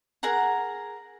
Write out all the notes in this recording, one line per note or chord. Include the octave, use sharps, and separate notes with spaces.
G#4 A#4 F#5 A#5